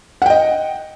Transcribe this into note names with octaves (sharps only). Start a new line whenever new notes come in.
D#5 F#5 G5